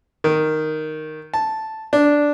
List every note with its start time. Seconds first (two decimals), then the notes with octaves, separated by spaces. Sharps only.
0.24 D#3
1.34 A5
1.93 D4